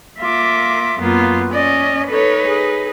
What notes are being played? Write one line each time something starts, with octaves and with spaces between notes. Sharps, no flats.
A#3 F4 E5 D6
F#2 A#3 B3 F4
C#4 D5 D#5
D#4 A4 B4 C#5
G#4